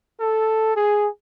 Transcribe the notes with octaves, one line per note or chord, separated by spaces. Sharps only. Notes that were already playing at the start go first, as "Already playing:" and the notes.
A4
G#4